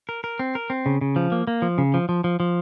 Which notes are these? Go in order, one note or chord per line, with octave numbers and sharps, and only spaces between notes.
A#4
A#4
C4
A#4
C4
C#3
C#3
F3
A#3
A#3
F3
C#3
F3
F3
F3
F3